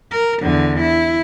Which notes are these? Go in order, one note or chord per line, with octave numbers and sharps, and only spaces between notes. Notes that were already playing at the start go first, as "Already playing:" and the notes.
A#4
E2 D3
E4